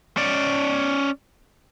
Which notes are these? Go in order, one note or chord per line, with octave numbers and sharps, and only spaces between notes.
C#4 D5